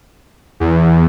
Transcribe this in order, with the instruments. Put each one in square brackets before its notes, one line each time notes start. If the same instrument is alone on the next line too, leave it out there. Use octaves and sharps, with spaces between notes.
[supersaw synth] E2